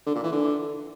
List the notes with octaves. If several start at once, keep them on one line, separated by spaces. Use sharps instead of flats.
D3
A#2
E3
D3